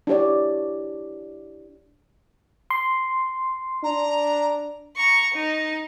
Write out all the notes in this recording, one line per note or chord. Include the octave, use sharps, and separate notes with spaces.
D4 E4 G4 C#5 D5
C6
D4 A#5
A#5 C#6
D#4